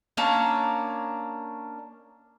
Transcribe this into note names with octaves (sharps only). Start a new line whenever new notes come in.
A#3 C#4 D4